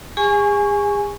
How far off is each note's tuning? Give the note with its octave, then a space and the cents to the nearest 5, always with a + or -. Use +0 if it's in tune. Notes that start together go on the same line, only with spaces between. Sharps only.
G#4 -40 G#5 +0 C#6 +0